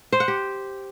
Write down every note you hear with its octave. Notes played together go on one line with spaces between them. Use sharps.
C5
F#5
G4